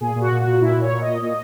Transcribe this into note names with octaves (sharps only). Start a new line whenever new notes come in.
A#2 G#4
A#2
F#4
A#2
F#4
A#2
A#2 E4
A#2
C#5
A#2
D#5
A#2
A#2